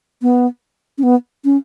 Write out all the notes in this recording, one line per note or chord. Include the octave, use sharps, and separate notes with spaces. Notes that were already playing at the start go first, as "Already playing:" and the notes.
B3
C#4
B3
C#4